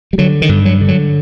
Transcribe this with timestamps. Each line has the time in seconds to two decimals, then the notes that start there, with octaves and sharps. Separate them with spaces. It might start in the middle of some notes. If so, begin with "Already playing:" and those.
0.13 G3
0.18 D3 F#3
0.42 D#3
0.49 G2
0.65 F#3
0.81 D3
0.88 F#3